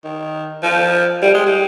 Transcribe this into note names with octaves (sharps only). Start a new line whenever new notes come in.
D#3
F3
G3
G#3
G3